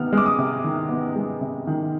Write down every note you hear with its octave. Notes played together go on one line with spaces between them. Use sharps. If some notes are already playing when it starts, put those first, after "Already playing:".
Already playing: C3 D#3 B3 F6
G#3
D6
D#6
C3
D#3
B3
G#3
C3
D#3